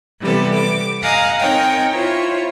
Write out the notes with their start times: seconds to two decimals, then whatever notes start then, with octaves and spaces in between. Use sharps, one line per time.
0.21 C3 E3 G3 B3 A4
0.54 D6
1.02 D#5 F5 F#5 G#5 A#5
1.39 C4 D#4 A#4 C#5 G5
1.92 E4 F4 C5 C#5